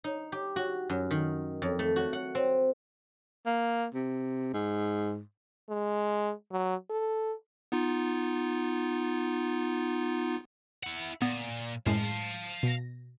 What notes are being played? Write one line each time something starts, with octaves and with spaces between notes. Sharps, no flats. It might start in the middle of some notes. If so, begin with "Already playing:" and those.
D#4
G4
F#4
F#2
D#3
F2
A3
F#4
F#5
C4
A#3
C3
G#2
G#3
F#3
A4
B3 D#4 F4
E4 F#5
A#2 B3
F#2 A2 G#3 F5 A5
B2 A#6